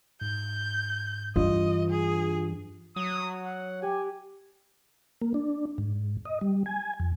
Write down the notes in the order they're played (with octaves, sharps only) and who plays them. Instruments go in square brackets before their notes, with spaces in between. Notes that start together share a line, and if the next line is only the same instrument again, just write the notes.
[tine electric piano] G#2 [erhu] G6
[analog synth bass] G2 [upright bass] E3 [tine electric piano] F4 [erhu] D#5
[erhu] G#4
[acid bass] F#3 [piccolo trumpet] D#6
[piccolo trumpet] F#5
[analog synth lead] G4 [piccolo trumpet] G#5
[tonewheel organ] A#3
D4
G#2
D#5
G3
G#5
F2